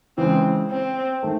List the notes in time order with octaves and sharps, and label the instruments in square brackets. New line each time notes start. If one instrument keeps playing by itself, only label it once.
[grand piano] C#3 E3 G#3 [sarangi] C4
[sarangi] C4
[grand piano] D#3 A3